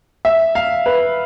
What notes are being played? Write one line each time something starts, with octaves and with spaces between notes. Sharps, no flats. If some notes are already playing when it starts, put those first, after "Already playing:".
E5
F5
B4